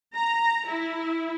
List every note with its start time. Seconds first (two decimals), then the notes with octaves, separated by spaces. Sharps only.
0.14 A#5
0.67 E4